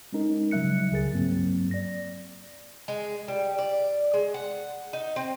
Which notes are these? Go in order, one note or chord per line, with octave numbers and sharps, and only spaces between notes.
G#3 C#4 D#4 A#4
C#3 F#3 G3 E5 F#6 C#7
C#2 C#3 F#3 G#4 A#4 A6
G2 F#3 A#3 C4
D5 A#6
G#3
G3
D5
G#3
F#5
D#4
C4